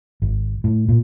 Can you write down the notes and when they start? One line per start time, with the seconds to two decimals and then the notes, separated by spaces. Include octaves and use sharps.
0.22 G#1
0.64 A2
0.89 A#2